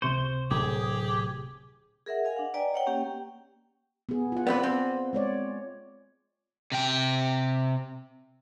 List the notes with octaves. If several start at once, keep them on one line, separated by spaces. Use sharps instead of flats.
C#2 C3 C5 C#6
D1 G4 G#4
G#4 A#4 E5 F#5
D#5 F5 G#5
D4 F#5
B4 D5 D#5 G5 G#5 A#5
C#5 F#5 G5
A#3 C#4 G4 G5
B3 G#4
F4 F#5
B3 C4 B4 D5
C4
G#3 C#5 D5
C3 G5